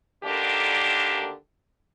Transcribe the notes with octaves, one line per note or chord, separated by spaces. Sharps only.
D2 D3 D#3 A#3 D4 G4